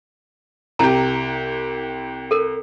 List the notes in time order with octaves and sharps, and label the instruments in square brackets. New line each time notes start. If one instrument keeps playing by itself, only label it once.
[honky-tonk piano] C2 G4 [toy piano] E4 A5 A#5
[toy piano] A4 A#4